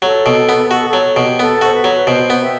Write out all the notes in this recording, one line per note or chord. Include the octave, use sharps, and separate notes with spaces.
F#3 A4
B2
B3
F#4 A4
A4
F#3
B2
G4
B3 A4
F#4 C5
B4
F#3
B4
B2 C5
B3
E5 G5